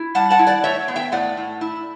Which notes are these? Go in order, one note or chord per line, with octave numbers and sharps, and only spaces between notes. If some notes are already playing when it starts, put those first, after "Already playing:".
Already playing: E4
G3 F#5 A5
F#5 A5
E4
D5 F#5
A2 C#5 E5
B3
E5 G5
A2 D5 F#5
A2
E4